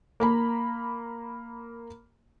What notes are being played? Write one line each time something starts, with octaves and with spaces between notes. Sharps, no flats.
A#3 A#5 B5